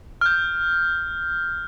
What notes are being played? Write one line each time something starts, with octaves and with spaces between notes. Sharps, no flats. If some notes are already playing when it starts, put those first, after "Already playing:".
F6 G6